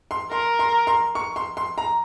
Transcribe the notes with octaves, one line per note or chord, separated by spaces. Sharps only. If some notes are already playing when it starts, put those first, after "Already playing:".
C6
A#4 C6
C6
C6
C#6
C6
C6
A#5